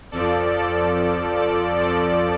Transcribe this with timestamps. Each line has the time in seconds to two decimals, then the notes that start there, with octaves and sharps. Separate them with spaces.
0.12 F2 F3 A4 D5
0.53 A4 D5
1.38 A4 D5
1.79 F2 F3 A4 D5